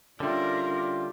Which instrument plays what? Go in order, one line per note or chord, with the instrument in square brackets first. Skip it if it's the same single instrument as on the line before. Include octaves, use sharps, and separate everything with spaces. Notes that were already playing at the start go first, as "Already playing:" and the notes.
[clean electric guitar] D3 G3 [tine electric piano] C#4 G4 E5 [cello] D4 A#4 [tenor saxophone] F4